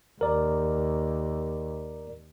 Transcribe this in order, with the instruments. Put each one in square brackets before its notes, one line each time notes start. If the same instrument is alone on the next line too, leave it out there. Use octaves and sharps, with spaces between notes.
[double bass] D#2 [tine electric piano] A#4 D5